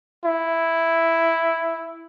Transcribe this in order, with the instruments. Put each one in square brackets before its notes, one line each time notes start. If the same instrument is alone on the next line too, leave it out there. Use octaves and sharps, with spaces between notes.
[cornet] E4